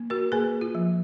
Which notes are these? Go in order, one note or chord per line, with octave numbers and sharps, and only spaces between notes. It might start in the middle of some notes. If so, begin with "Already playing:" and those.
Already playing: A#3
F#4 A#4
A#3 G#4 B4
F4
F3